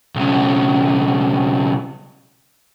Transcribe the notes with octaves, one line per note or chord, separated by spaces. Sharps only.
B1 C#3